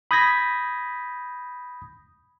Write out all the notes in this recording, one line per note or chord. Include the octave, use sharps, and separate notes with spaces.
B5 D#6 G6 G#6 A#6 B6